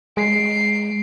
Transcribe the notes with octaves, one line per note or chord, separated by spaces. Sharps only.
G#3 C7 D7